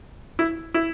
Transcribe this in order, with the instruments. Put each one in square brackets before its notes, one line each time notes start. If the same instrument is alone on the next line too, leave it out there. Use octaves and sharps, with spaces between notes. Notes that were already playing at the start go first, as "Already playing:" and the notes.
[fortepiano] E4
E4